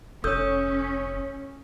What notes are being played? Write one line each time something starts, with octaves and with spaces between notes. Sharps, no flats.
F1 C#4 A4 C#5 D#6 E6 G6